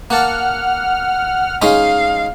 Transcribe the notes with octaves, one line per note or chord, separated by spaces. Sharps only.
A#3 F#5 A5 F6
G#3 C#4 D#4 F5